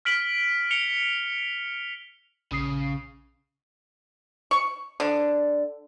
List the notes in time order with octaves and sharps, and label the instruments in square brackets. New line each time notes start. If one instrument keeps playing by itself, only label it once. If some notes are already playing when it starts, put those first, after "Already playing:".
[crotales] F6 B6 D7 F#7
C#7 F7 G7
[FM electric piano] A#1 D#6 C7 [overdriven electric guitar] C#3
[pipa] C#6
D3